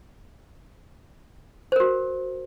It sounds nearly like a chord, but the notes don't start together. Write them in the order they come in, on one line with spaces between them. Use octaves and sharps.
C5 A#4 F#4